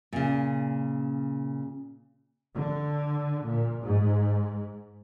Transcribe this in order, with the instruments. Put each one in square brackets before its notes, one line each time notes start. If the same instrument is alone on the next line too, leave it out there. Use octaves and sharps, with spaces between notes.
[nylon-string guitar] A#2 C#3
[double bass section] D3
A#2
G#2